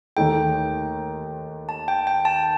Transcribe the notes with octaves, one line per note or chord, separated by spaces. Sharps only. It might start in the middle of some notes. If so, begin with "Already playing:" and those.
D#2 D#3 A3 D#4 A4 G5
A5
G5
G5
A5